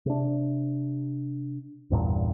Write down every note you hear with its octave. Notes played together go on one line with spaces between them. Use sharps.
C3 D4
A1 E2 G2 A#2